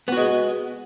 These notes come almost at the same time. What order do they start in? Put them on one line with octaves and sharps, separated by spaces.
B3 F#4 G#3